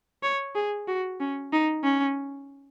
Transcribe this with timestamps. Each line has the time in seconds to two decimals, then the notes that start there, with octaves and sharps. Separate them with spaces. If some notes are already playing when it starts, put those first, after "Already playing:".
0.23 C#5
0.55 G#4
0.88 F#4
1.20 C#4
1.53 D#4
1.84 C#4